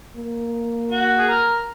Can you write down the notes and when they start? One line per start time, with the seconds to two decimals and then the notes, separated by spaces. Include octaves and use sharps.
0.16 A#3
0.91 F#4
1.18 G#4
1.28 A#4